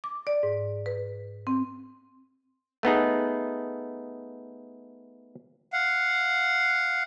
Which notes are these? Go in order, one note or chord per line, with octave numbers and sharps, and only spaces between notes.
D6
D5
G#2
B4
C4
A3 B3 D#4 G#4
F5 F#5